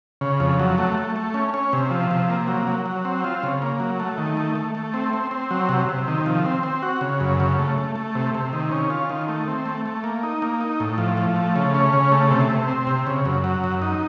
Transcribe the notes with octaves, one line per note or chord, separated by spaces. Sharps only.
C#3
F2
F#3
A3
A3
A3
C#4
C#4
C3
F3
C3
A#3
F#3
F#3
F#3
C4
F4
C#3
A#3
F#3
A3
D#3
A3
A3
A3
C4
C4
C4
F#3
C3
C3
D#3
F3
C4
C4
F#4
C#3
F#2
C#3
A3
A3
A3
C3
C3
D#3
C#4
F4
D#3
A3
C4
A3
A3
A#3
D#4
A#3
D#4
A2
F3
F3
A3
C#3
C#4
C#3
A3
C3
C3
C4
C3
C#3
F#2
F#3
F#2
D#4